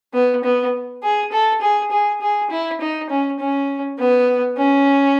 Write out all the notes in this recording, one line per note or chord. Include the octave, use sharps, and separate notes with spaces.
B3
B3
G#4
A4
G#4
G#4
G#4
E4
D#4
C#4
C#4
B3
C#4